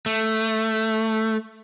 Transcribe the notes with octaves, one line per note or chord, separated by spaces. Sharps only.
A3